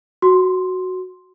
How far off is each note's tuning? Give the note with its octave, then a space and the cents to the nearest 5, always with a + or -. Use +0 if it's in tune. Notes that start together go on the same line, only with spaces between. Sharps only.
F#4 +0 C6 +0